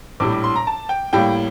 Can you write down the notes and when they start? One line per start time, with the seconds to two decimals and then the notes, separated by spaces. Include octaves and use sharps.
0.20 A#1 A2 G3 D6
0.32 D6
0.44 C6
0.56 A#5
0.67 A5
0.89 G5
1.13 A2 G3 A#3 G5